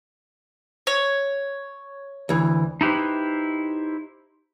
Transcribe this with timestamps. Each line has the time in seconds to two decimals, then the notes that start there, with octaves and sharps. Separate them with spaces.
0.87 C#5
2.29 D2 E3
2.81 D#4 E4 G4 B4 C5